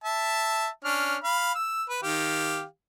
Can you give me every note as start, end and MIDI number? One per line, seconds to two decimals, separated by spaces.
0.04 0.68 76
0.04 0.68 81
0.84 1.17 61
0.84 1.17 62
0.84 1.17 89
1.24 1.52 77
1.24 1.52 83
1.55 1.85 88
1.90 2.01 71
2.03 2.64 51
2.03 2.64 67
2.03 2.64 77